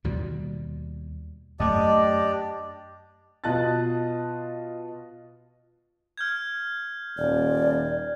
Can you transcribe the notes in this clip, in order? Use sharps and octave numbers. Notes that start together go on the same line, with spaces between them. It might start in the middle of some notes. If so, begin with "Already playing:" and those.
D#2 B2 G3
F#2 A3 D4 G4 D5 D#5
B2 F4 D#5 A5 F#6 A6
F6 G6 G#6
D#1 D5